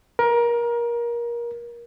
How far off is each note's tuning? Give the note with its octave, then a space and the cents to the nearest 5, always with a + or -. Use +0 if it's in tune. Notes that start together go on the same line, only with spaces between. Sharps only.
A#4 +25